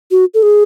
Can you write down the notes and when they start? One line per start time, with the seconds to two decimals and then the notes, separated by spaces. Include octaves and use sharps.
0.11 F#4
0.34 A4
0.43 G#4